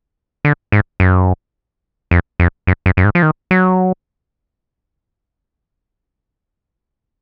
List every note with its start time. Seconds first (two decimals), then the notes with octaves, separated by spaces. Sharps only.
0.45 D3
0.72 G#2
1.00 F#2
2.11 F2
2.40 F2
2.67 F#2
2.86 F#2
2.97 F#2
3.05 G#2
3.15 F3
3.23 D#3
3.51 F#3